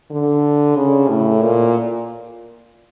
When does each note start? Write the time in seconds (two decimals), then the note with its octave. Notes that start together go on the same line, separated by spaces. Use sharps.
0.10 D3
0.76 C#3
1.09 A2
1.41 A#2